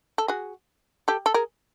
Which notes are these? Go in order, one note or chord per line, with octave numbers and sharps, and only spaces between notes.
A4
F#4 G#4
G4 A4
A4
G#4 A#4